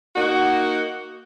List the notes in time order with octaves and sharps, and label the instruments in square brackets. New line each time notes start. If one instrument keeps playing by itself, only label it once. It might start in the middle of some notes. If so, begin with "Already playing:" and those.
[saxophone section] A#3 D#4 F#4